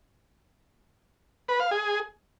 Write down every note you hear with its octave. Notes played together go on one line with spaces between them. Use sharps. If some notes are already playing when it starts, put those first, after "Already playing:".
B4
F5
G#4